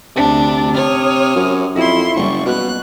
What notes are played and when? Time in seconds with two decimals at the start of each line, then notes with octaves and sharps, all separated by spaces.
0.16 D2 C3 D4
0.74 C#5 D#6 F6
1.36 F#2
1.76 F2 E4 C6
2.16 F#1 G3 C#6
2.46 B2 F#6